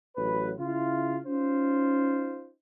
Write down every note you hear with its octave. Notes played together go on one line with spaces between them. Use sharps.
A1 F#3 B4
C#3 E4 F4
C#4 D#4 F4 C5